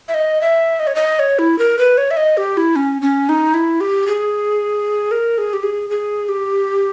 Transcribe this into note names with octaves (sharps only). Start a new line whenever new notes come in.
E5
D#5
E5
D#5
C#5
D#5
C#5
E4
A#4
B4
C#5
E5
D#5
G4
E4
C#4
C#4
D#4
E4
G4
G#4
A#4
G#4
G4
G#4
G#4
G4